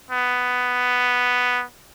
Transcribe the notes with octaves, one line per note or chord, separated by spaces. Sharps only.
B3